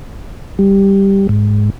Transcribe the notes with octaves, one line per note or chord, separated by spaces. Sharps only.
G3
G#2